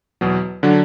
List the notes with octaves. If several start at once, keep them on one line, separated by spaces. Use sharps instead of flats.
E2 B2 F#3
D3 F#3 D4